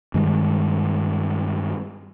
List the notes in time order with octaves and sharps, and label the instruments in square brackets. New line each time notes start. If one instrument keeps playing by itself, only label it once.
[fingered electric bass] G2 D#3 G#3